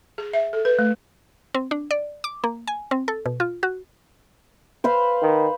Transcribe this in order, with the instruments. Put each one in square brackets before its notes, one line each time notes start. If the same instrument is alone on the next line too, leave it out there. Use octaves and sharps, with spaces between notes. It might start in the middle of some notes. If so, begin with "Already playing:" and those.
[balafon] G#4
E5
A4
B4
A3
[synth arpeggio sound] C4
D4
D5
D6
A#3
G#5
C4
A4
B2
F4
F#4
[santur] B4 C5 F5
[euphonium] D#3